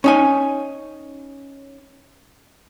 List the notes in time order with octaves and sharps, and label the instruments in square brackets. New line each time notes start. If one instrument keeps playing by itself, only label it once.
[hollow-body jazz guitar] C#4 D#4 G#5